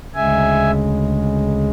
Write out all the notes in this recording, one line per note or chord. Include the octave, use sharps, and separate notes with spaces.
D2 C#3 G#3 E5 G#5